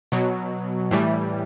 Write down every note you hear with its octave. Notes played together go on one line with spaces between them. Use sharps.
B2 F#3
A2 E3 G3